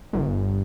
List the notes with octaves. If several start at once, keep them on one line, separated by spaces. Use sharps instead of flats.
G1